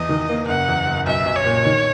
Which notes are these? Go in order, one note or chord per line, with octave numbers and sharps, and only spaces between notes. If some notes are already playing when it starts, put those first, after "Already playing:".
Already playing: E2 D#5
D#3
A#3
F#1 F#5
E2
F#1
B1 E5
B1
C#5
A#2
D#3